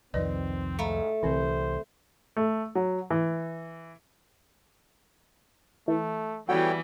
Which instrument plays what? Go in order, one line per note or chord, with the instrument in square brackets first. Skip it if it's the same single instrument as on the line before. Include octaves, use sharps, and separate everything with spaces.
[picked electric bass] C2 F2 D#3 [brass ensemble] C4 [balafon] B4 D5 D#5
[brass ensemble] G#2 [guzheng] A3 [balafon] F5 A#5 B5
[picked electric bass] C2 E3 [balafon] D3 C4 [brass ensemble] G3 C5
[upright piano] A3
F#3
E3
[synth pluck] E3 [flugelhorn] A3
[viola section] E3 B3 [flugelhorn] G3 [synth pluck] F#4 [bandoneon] A4 C#5 G5